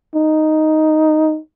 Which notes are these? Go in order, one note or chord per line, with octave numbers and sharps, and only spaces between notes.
D#4